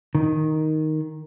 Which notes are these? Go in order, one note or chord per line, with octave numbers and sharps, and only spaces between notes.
D#3